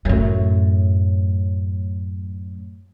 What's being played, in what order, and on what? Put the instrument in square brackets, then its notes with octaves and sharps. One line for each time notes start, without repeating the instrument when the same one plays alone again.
[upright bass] F#2 A2